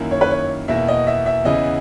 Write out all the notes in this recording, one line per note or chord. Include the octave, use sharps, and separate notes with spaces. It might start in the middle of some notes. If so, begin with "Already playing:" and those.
Already playing: F#2 D#3 A#3 E4
C#5
B4
C#5
E2 B2 A#3 E5
D#5
E5
E5
E2 C#3 E3 B3 E4 D#5